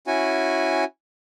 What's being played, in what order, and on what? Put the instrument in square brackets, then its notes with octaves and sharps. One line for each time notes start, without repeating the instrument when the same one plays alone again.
[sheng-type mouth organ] C#4 E4 F#4 G#5